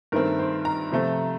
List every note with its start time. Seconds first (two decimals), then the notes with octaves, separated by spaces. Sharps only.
0.12 G2 D#3 A3 C4 A#4
0.39 C5
0.65 A#5
0.92 C3 F3 A3 C4